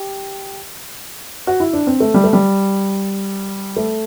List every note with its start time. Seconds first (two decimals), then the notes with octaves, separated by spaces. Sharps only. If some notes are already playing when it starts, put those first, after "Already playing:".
Already playing: G4
1.47 F#4
1.60 E4
1.73 D4
1.87 C4
2.00 A3
2.14 G3
2.24 A3
2.33 G3
3.76 A3